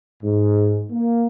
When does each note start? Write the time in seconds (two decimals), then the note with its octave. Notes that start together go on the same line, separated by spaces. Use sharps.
0.23 G#2
0.91 A#3